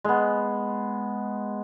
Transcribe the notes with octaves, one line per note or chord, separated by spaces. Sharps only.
G#3 B3